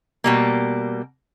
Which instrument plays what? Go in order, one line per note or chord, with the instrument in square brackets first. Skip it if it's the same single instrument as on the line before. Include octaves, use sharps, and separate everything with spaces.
[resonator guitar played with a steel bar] B2 G3 A#3